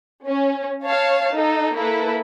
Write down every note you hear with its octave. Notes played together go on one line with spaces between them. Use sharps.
C#4
C#5 F5 A5
D#4 A4
A#3 E4 A4 B4